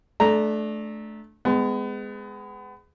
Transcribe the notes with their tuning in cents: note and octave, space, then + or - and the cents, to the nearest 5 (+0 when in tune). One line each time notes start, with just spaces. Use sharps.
A3 -20 D4 +0 A#5 -5
G#3 +0 B3 +30